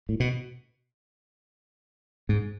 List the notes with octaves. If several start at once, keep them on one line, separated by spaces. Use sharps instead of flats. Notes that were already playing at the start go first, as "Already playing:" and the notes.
A2
B2
G#2